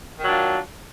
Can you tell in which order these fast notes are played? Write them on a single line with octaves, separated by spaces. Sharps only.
D#3 F#3 D4 F4